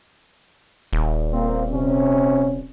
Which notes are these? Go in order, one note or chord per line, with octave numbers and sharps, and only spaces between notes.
D#1
A#3 C4
C3 C#4